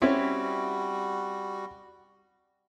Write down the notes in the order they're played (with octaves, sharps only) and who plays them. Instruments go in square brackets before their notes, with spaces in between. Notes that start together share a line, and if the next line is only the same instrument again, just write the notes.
[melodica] G3 F#4 [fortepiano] C4 C#4 E4